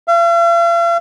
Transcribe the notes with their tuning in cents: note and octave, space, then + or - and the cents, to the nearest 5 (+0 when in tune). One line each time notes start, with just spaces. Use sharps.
F5 -45